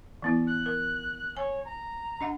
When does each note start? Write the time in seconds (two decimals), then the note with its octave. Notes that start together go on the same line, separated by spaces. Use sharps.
0.22 E3 B3 E4
0.47 F#6
0.66 A#4
1.37 C#5 G#5
1.65 A#5
2.21 D4 D#5 F#5